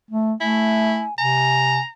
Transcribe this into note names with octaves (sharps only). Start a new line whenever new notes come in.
A3
A3 E4 G#5
C3 G#5 A#5